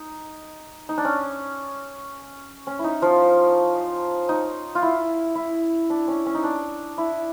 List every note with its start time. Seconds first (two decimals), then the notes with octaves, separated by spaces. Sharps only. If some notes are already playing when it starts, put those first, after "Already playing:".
Already playing: D#4
0.89 D#4
0.98 D4
1.05 C#4
2.67 C#4
2.79 E4
2.84 D#4
3.02 F3 F4
4.29 D#4
4.75 F4
4.83 E4
5.35 E4
5.90 D4
6.08 C#4
6.26 C#4
6.35 D#4
6.44 D4
6.98 E4